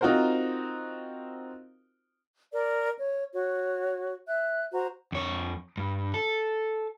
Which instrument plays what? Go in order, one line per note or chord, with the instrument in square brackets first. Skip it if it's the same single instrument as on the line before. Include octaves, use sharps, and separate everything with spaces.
[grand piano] C4 D#4 F4 F#4 A#4 C5
[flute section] A#4 D5
C#5
F#4 C#5
E5 F#6
F#4 C5 A#5
[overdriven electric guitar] F2 C#5
G2
A4